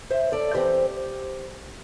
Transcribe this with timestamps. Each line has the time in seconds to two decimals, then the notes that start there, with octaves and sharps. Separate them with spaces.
0.10 C5 E5
0.32 A4 D5
0.54 E2 E3 C4 G4 C5